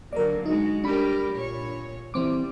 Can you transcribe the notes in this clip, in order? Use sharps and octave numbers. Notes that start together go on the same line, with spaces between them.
D3 F#3 A#3 A#4 D5
G#3 D#4 F#4
G3 D4 G4 A#4 B5
A#2 C#5
E3 G3 C4 D6